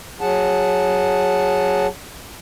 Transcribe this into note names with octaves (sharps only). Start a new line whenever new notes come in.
F#3 G#4 F#5 A5